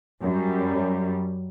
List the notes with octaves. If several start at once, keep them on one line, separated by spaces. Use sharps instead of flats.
F#2 G3